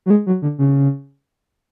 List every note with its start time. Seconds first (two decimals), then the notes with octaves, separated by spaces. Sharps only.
0.06 F#3
0.10 G#3
0.26 F#3
0.42 D3
0.58 C#3